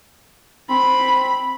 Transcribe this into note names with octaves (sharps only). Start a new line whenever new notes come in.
C4 B5